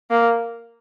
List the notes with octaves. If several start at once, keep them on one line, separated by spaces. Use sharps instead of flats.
A#3